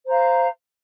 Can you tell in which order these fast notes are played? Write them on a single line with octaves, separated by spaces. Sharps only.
C5 A#5 F5